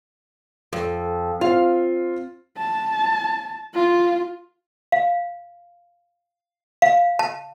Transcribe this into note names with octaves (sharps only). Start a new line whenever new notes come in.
F2
C4 F4 F5
A5
F4
F5
F5
A5